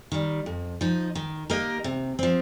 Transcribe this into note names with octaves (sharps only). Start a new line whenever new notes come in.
D#3 G3
F2
F3 D#4
D#3
A#3 G4 A#4 D#5
C3
F3 C4